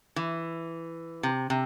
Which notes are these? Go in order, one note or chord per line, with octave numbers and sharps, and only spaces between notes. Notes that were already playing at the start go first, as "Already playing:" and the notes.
E3
C3
C3